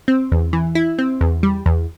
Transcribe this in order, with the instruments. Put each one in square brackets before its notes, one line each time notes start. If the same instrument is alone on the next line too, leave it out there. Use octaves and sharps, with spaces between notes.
[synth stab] C4
E2
E3
E4
C4
E2
G3
E2